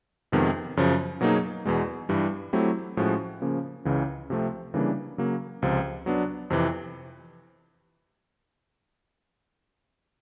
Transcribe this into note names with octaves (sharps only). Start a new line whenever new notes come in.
F2 C3 D#3 G#3 B3
F#2 C#3 F3
B2 F#3 A#3 D#4 G#4
E2 B2 G#3
G2 E3 G3
F#3 A3 C4 E4 G4
A2 F3 G#3 C#4 F#4
C#3 F3 A#3 C#4
C#2 C#3 E3
C3 F3 A3 C4
C#3 E3 G3 A#3 D4
C#3 F#3 A#3
C#2 C3 F3
F#3 B3 D4
F2 C3 E3